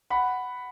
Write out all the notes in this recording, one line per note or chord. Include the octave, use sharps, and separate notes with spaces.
F#5 B5